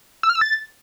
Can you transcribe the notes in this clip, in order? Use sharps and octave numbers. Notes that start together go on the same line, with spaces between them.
E6
F6
E6
A6